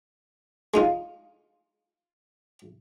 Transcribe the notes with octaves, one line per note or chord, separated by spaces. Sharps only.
G#3 D#4 F4